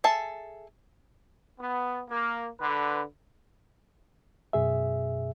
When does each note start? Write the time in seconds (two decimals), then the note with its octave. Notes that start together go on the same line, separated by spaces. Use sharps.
0.04 G#4 A4 E5 A5
1.59 B3
2.09 A#3
2.60 D3 B4
4.53 F#2 B2 G#4 E5